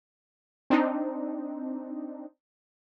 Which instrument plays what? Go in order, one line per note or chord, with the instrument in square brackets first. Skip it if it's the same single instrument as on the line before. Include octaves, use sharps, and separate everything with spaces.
[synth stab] C4 D4 D#4